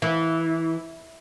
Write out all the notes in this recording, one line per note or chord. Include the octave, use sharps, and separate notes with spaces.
E3